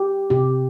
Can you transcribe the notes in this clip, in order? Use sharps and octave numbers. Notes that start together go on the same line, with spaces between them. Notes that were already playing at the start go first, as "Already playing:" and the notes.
Already playing: G4
C3 G4